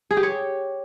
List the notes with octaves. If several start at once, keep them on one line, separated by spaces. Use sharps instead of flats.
G#4
G4
C#5